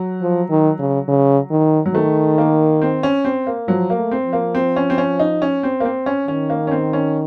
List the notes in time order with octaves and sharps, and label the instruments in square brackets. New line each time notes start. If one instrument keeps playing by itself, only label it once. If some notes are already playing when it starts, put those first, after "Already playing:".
Already playing: [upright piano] F#3
[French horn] F3
D#3
C#3
C#3
D#3
[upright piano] F#3
[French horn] D#3 [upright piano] A3
[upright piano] A#3
C4
C#4
C4
A#3
[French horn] F3 [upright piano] F#3
[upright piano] A#3
[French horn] A3
[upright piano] C4
[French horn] F3
[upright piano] A#3
C4
C#4
C4
C#4
D#4
C#4
C4
A#3
C4
C#4
[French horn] D#3 [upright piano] C#4
[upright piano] A#3
C#4
C4
C#4